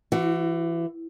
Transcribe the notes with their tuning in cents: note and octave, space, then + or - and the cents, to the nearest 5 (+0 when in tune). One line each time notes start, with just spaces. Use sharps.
E3 +30 F#4 +0